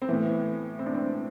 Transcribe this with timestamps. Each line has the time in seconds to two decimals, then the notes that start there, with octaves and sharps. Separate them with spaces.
0.02 C4
0.09 A2 E3 B3
0.79 C4
0.86 D4
0.94 C4